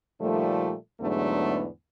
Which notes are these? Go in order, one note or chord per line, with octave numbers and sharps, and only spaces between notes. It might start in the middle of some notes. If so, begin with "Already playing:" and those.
A#2 D#3 F3 G3 A3
E2 G#2 D3 F#3 A3 B3